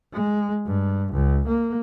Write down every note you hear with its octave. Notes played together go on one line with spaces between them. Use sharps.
G#3
G2
C#2
A#3